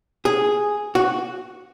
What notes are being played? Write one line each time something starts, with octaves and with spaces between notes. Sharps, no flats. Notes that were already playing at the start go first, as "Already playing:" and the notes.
G#4
F#4